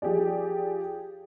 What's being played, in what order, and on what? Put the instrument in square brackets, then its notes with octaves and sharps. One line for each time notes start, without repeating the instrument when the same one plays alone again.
[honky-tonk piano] F3 G4 G#4 D5